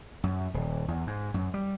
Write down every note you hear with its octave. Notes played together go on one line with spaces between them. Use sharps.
F#2
D#1
E2
G#2
F#2
G3